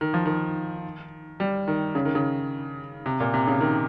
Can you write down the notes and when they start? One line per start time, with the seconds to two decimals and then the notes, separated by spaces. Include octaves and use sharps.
0.01 D#3
0.14 F3
0.26 D#3
1.40 G3
1.68 D#3
1.95 C#3
2.05 D#3
2.15 C#3
3.06 C3
3.20 A#2
3.34 C3
3.47 C#3
3.61 D#3